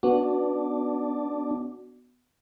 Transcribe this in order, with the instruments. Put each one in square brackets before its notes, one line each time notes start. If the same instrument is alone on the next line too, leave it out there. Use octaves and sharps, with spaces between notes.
[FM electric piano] B3 F#4 [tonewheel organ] D4